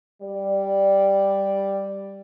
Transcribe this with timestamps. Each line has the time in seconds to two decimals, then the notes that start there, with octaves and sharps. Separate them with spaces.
0.22 G3 D5